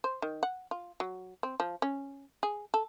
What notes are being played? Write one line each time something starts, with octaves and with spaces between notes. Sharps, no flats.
C5
D#3
F#5
F4
F#3
C4
F3
C#4
G#4
A4